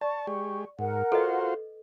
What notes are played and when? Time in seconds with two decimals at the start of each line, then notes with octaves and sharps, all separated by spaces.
0.01 D5 A5 C#6
0.27 G#3 G4
0.79 G#2 A#4 F#5
1.12 F4 F#4 A4 B4 C5 D#5